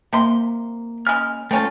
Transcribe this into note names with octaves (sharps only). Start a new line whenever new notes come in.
C3 A#3 C6
C#3 G#3 F6
A3 C4 C#4 F4